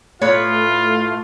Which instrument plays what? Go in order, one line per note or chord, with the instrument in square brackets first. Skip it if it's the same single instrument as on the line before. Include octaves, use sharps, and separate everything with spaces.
[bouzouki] A2 B4 [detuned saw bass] A3 [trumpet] F4 [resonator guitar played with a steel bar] C#5